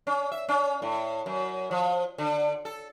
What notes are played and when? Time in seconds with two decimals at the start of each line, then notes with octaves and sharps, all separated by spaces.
0.07 C#4
0.32 E5
0.49 C#4
0.82 A2
1.26 F#2
1.71 F3
2.18 D3
2.65 A4